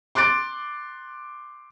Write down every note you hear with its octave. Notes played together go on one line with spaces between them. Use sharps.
C6 D6 F#6 A6 D7